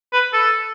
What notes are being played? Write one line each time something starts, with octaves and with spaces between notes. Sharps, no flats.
B4
A4